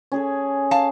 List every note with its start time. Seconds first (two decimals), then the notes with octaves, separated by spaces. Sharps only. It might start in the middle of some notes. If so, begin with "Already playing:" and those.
0.12 C#4 G#4 A4
0.71 F5 A5